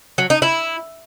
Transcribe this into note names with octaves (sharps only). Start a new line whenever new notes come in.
F#3
D#4
E4